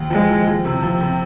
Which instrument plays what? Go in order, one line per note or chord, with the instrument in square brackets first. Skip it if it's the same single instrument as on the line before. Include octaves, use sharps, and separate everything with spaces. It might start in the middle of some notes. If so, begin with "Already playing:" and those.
Already playing: [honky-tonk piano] D#2
[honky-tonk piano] F3 [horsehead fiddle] G#3
[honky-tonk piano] F3
F3
C3
F3
C3